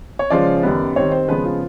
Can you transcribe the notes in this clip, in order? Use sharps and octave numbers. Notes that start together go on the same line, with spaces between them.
C#5
C#3 F3 G#3 C#4 F4 D5
F#2 D#3 G3 B3
D#3 G3 C4 C#5
C5
C#3 F3 G#3 B3 B4
F4